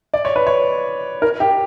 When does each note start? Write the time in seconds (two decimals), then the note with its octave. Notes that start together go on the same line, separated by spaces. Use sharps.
0.14 D5
0.25 C#5
0.36 B4
0.47 C#5
1.22 A#4
1.40 G4